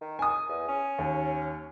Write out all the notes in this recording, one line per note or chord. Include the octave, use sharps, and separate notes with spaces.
D#3
G#5 D#6
E2
C#4
D#2